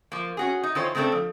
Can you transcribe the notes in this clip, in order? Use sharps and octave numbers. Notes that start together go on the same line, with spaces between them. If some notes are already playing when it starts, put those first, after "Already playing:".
F3 A#3
C#4 F#4 G#4
D#4
D#3 E3 F4 A4 C5 C#5
C#3 A3 C4 D4 A4
F3